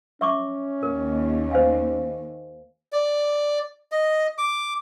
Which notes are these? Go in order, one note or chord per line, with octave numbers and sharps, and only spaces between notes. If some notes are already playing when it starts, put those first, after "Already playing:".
C#4 E5 C#6 D6
D#2 A#4
C5 F5 G#5
D5
D#5
D6